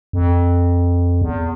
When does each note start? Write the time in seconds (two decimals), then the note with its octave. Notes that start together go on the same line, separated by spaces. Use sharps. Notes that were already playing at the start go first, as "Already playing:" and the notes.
0.13 F2
1.22 E2